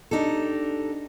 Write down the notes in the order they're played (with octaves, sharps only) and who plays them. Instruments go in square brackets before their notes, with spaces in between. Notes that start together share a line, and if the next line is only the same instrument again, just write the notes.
[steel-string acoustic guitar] D4 D#4 G4 A4